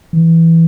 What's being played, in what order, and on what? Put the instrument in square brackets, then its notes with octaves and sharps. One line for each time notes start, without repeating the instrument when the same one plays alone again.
[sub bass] E3